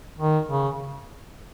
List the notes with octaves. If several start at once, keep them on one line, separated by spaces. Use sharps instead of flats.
D#3
C#3